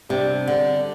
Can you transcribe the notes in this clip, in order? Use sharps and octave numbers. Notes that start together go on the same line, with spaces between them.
C3 G3 D4 G4 D5
D3